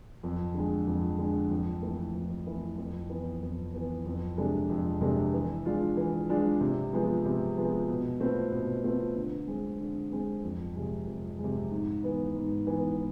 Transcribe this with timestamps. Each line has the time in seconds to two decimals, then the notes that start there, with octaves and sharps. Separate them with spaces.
0.23 F2
0.54 D3 G#3
0.87 F2
1.18 D3 G#3
1.50 F2
1.83 E3 A3 E4
2.15 F2
2.47 E3 A3 E4
2.78 F2
3.10 E3 B3
3.42 F2
3.73 E3 B3
4.06 F2
4.38 C3 G#3 D4 A4
4.70 F2
5.01 C3 G#3 D4 A4
5.33 E3
5.66 G#3 D4 F4
5.97 E3
6.29 G#3 D4 F4
6.61 C3
6.93 F3 G#3 B3
7.25 C3
7.57 F3 G#3 B3
7.89 B2
8.20 A3 C4 F4 B4
8.52 B2
8.84 A3 C4 F4 B4
9.16 D3
9.48 G#3 C4
9.79 D3
10.12 G#3 C4
10.44 F2
10.76 C3 G#3
11.07 F2
11.39 G#3
11.44 C3
11.71 G#2
12.03 E3 B3
12.36 G#2
12.67 E3 B3